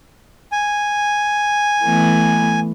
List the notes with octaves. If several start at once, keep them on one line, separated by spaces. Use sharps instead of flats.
G#5
E3 A3 B3